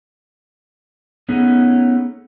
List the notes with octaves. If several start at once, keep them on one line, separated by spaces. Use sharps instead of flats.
A3 B3 C#4 D#4 G#4